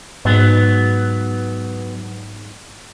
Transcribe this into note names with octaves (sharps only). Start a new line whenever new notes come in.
G#2 F#3 B3